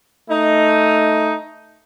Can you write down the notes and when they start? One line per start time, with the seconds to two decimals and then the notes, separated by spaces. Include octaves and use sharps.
0.30 A3 D#4